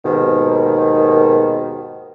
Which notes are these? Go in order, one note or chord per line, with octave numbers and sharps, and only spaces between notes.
D#2 G#2 B2 D#3